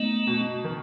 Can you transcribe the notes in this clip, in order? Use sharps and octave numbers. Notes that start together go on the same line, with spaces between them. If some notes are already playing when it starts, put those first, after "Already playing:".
Already playing: A3 B3 D#4
B2
D#3